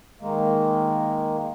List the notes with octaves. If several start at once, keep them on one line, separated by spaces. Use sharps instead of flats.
D#3 G#3 A#3